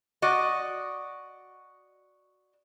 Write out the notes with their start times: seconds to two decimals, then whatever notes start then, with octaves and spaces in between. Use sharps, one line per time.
0.22 F#4 D5 D#5